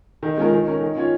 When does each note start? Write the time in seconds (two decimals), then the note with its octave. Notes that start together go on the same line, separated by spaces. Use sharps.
0.23 D#3
0.38 G#3 C#4 F4 A#4
0.52 D#3
0.67 C#4 A#4 C#5
0.81 D#3
0.96 C#4 F4 C#5